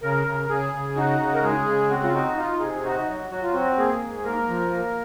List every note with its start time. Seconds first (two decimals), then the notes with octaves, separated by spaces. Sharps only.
0.03 C#3 A#4
0.27 C#3
0.49 C#3 G#4
0.73 C#3
0.96 D#4 F#4
1.20 C#3
1.34 A#4
1.43 G#3 G#4
1.67 C#3
1.90 C4 F#4
2.04 F4
2.14 D#4 F#4
2.37 D#4 F4
2.60 C3 G#4
2.83 D#4 F#4
3.08 F#3
3.31 F#3 F#4
3.42 F4
3.52 C4 F#4
3.78 A#3 G#4
4.01 G#2
4.24 A#3 A#4
4.48 F3
4.71 A#3